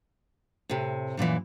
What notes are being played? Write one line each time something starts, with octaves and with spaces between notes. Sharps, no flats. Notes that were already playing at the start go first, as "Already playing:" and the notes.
A2 C3
F#2 A#2 D3 E3